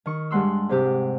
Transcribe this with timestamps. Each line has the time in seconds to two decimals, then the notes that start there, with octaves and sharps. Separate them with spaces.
0.06 D#3 C#6
0.31 G2 G3 G#3 F#5 C6 E6
0.69 G#2 C3 G4 E6